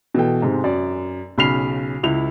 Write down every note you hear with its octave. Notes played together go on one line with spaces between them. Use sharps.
B2 E3 A4 G5
G#2 C3 G#3
F#2 D5
B1 C#3 B5 F6 C7 F7
C#2 E4 F7